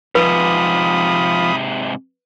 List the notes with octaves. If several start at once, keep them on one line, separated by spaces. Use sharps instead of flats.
G#2 C3 F3 B4 B5 D#6